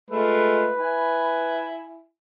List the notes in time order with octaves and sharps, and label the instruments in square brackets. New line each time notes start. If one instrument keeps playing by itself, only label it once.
[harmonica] G#3 A3 F4 [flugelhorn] B4
[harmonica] E4 G#5